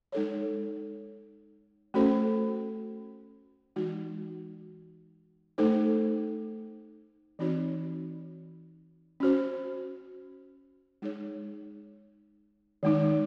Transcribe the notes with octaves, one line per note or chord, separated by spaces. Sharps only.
G#3 D#4 A4 C#5
A3 C#4 F#4 A4 C5
E3 G#3 D#4 F#4
A3 D#4 A4 C5
E3 C4 D#4 F#4 C#5
C#4 F#4 C5
G#3 D#4 G#4 C#5
D#3 G#3 D#4